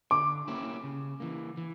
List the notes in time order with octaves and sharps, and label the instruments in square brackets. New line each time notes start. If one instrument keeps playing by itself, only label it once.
[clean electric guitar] D3 [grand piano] D6
[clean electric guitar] A#3 C#4 E4 G4
C#3
E3 A#3
E3